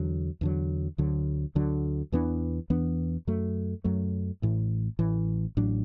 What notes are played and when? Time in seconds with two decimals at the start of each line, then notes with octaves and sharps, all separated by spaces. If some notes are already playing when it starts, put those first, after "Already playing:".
Already playing: E2 D3 F#3
0.41 E2 D3 F#3
0.98 D2 D3 F#3
1.55 D2 D3 F#3
2.12 E2 E3 B3 D4
2.70 E2 E3 B3 D4
3.27 F#2 F#3 A3
3.84 F#2 F#3 A3
4.42 A1 A2 E3
4.99 A1 A2 E3
5.57 A1 A2 F#3 D4